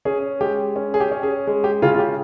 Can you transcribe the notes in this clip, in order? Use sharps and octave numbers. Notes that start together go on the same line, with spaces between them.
C#4 G#4
G#3 G4
C#4
G#4
G4
C#4
G#4
G#3
G4
C#3 F4
F4
G4